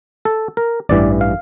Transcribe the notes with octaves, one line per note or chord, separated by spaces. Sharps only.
A4
A#4
A1 G2 E3 D5
F5